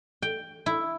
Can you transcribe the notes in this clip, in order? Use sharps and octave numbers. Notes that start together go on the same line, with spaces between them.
G5
E4